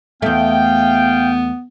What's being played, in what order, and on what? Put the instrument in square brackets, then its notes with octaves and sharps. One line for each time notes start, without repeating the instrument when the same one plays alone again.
[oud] E2 A3 [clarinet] B3 [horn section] F5 G5